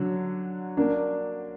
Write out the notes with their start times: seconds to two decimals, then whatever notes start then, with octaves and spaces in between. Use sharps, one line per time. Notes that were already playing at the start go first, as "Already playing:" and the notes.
Already playing: D3 F#3
0.77 A#3 D4